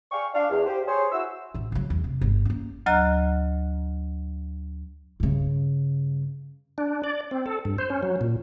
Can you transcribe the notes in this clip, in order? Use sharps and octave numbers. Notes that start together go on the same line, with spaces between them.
D5 F5 G5 G#5 C#6
D4 F5
E2
G4 C5
G#4 C5 C#5
E4 F#4 E6
A1 F#2
C#3 F#3
E2
C3
G1
A#3 C#4
D2 F#3 D#5 A#5 F6 F#6
G2 C#3
D4
D5
C4
A4
G2
C5
C#4
F#3
A#2